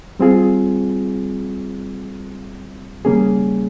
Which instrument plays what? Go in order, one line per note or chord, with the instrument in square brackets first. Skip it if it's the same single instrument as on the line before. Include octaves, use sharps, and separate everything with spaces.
[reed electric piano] G3 C4 F4 G#4
C#3 G3 A#3 C#4 G#4